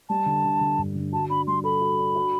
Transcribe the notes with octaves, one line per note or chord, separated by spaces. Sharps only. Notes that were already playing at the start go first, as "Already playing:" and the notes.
G3 A5
D3
D3
D3
G2
D3
F#4 A5
D4 B5
G3 C6
A4 B5
F#4
D4
F#4